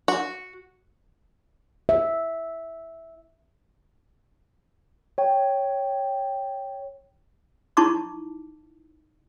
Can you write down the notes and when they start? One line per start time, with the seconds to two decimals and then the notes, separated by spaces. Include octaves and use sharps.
0.08 F#4
1.89 E5
5.18 C#5 G5
7.77 D#4 E4 A5 C#6 D6